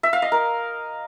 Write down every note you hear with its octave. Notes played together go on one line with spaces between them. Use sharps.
E5
F5
D#5
A#4